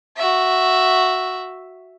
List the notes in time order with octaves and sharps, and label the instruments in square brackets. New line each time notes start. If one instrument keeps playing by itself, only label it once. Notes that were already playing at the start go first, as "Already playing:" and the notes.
[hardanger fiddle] F#4 E5